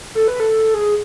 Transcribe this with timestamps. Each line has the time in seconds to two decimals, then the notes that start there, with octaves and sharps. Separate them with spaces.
0.15 A4
0.28 B4
0.40 A4
0.74 G#4